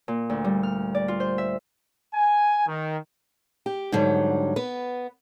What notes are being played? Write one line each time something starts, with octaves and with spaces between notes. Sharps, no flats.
A#2
D2
G3
F6
D5
F4
C5
E5
G#5
D#3
G4
G#2 D3 F#3 G3
B3 B4